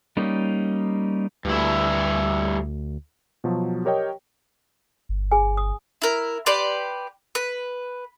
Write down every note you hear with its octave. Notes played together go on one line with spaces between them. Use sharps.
G3 A#3 C#4 D#4
D2 G2 E4
B2 F3 F#3 A5
G4 A#4 C#5 D#5 G5
G1
G#4 G#5
D#6
E4 A#4
G4 B4 D5 C6
B4